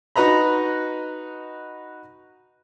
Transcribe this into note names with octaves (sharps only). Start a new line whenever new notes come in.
D#4 F#4 B4 D#5 A#5 B5